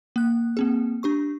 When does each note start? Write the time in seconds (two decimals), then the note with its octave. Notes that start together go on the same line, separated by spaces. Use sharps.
0.16 A#3 F#6
0.57 A#3 C4 G#4
1.03 D4 G4 C#6